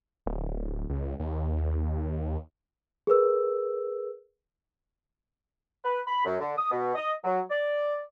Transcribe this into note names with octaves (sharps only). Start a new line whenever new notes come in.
D1
C#2
D#2
G#4 A#4 B4 E6
B4
B5
F#2
D3
D#6
B2
D#5
F#3
D5